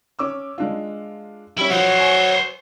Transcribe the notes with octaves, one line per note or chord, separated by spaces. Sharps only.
C#4 D6 E6
G#3 D4 F4
G3 C#4 E4
F3 F#3 C5 C#5
G#5